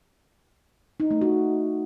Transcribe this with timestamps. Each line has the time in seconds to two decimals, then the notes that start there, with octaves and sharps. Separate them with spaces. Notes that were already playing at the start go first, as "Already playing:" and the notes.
1.00 D#4
1.11 A3
1.21 F#4